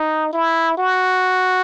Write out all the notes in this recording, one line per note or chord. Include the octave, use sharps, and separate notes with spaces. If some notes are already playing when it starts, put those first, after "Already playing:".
Already playing: D#4
E4
F#4